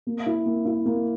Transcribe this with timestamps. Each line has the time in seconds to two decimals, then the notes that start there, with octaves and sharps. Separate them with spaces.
0.07 A#3
0.26 E4
0.46 A#3
0.65 E4
0.86 A#3